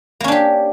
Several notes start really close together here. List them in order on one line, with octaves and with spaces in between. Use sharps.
A#3 C#4 D4 G4